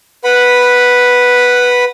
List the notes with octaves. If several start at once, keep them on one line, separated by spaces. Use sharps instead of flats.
B4 F#5 B5